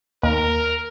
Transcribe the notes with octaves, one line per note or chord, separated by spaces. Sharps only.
D#2 A#4